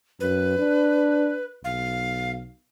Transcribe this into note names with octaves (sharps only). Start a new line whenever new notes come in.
F#2 B4
D4
B1 F5